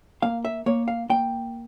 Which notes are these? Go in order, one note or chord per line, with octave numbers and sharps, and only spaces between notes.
A#3 F5
E5
A#3 C#5
F5
A#3 G5